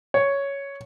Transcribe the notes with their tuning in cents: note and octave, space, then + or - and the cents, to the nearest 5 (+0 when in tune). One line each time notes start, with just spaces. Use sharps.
C#5 +5